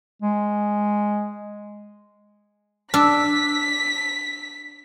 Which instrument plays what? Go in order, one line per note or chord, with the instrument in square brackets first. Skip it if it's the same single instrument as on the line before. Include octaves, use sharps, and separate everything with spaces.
[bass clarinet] G#3
[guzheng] D4 [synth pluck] E6 [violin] B6